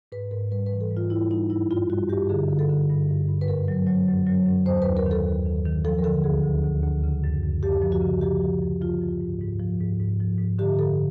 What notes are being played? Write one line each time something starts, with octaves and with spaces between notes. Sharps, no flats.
G#2 B4
G#2 A#4
G3 B4
B4
E3
A4
G#2
F4
G3 E4
G3 D#4
G2 E4
G2 F4
G3 F#4
G2 G4
D3 G#4
D3
A4
D3
G2
G2
G2
B4
F#2 A#4
F#3
F#3
F#2
F#3
F#2
D#2 C5
B4
D#2
A#4
D#3
A4
D#2
D#3
D#3
F3 A4
A#4
D3 A4
D2 G#4
D2
D2
D2
C#3
F#2
F#2
F#2 G4
F3
F#4
C#3
F3 G4
F3
F3
F3 F4
F3
G#2
G#2
F3
G#2
G#2
F3
G#2
D3 G4
F#2 A4